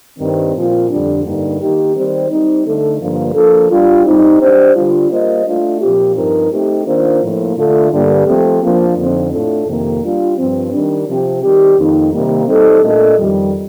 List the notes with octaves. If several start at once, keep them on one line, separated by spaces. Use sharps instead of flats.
G2 D#3 G3 C4
A#2 F3 C4 F4
F2 D3 G3 D4
G2 D3 G3 A#3 D#4
D#3 A#3 D#4 G4
D#3 G3 C4 G4 C5
G3 C4 D#4
D3 A3 D#4 A4
G2 D3 F3 A#3
F3 A#3 D4 A4
G3 D4 F4
G3 C4 D#4
G3 D4 G4 C5
D3 G3 D4 F4
G3 A#3 F4 C5 D#5
A3 D4 F4
A#2 F3 C4 G4
G2 F3 C4 D#4 A#4
A3 C4 D#4 G4
D#3 A#3 D4 F4 C5
A2 F3 A#3
D3 A3 D4 F4 A4
G2 D3 G3 A#3
F3 A3 C4 G4
F3 A#3 D4
F2 D3 F3 C4 D#4
A2 A3 D4 F4 A4
F2 C3 D#3 A#3
G3 D4 F4
G2 F3 C4
D#3 G3 D4
C3 F3 C4 G4
D#3 G3 C4 G4
F2 D#3 A#3 D#4
C3 D#3 G3 A#3
G3 C4 D#4 A4
A#2 A3 D4 A4 D#5
F2 D#3 G3